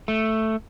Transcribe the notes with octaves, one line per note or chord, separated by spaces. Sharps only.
A3